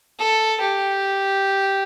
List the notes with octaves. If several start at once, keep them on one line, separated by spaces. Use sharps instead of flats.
A4
G4